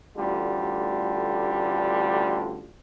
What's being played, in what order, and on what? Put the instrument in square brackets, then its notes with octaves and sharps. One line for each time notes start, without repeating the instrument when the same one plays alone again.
[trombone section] A1 D2 D3 G3 F4